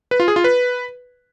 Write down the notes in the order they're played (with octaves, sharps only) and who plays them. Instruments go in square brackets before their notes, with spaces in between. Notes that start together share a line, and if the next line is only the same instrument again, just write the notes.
[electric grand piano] B4
F4
G#4
F4
B4